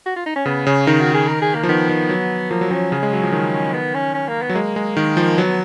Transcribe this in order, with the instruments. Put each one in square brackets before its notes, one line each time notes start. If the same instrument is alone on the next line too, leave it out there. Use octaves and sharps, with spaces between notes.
[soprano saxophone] F#4
F4
D#4
C#4
[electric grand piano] C#3 [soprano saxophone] B3
[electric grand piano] C#3 [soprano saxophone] C#4
[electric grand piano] D#3 [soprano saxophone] D#4
[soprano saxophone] F#4
G#4
A#4
G#4
A#3
[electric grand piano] F3
[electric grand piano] D#3 [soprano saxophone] B3
[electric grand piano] D#3
F#3
[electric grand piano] F3 [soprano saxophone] A#3
[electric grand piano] F#3
[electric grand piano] F3 [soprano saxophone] C#4
[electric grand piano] C#3
G#3
F#3
F3
D#3
[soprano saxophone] B3
C#4
C#4
A#3
B3
[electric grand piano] F#3
[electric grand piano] G#3 [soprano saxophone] A#3
[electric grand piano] G#3
D#3
F3
[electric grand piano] F#3 [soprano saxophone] B3